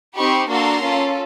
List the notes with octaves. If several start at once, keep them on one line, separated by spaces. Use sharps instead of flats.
C4 D#4 G4 B5 C#6
A#3 D4 F#4 A4 A#5 C6
C#4 F4 A4